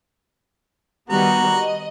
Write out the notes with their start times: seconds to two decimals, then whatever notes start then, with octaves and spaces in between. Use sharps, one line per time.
1.10 D#3 G3 B3 F#4 A#5
1.56 D#5